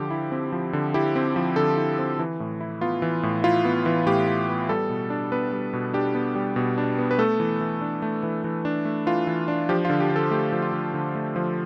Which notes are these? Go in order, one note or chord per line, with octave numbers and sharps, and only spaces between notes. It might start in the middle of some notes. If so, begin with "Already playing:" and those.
Already playing: D3 F3 G4
E4
C4
F3
D3
E4 G4
C4
F3
D3 A4
E4
C4
E3
A2
E4
B3 F4
E3
A2
E4 F4
B3
E3
A2 G4
E4
B3
G3 A4
B2
D4
B3 B4
G3
B2
D4 G4
B3
G3
B2
D4
B3
B4
A3 A4
E3
E3
D4
A3
E3
E3
D4
A3
E3 F4
E3
D4
F3 G4
F4
D3
G4
D3 A4
A3 G4
F3
F4
D3
D3
A3
F3